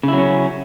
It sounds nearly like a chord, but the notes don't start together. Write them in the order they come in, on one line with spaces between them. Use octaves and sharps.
C#3 E4 F#3 C#4